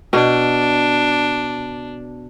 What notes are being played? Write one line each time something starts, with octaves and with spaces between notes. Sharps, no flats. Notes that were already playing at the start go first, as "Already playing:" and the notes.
B2 D4